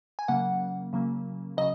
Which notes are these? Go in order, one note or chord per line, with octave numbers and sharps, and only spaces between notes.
G#5
C#3 F#3 A#3 F#5
C#3 F#3 A#3
C#3 F#3 D#5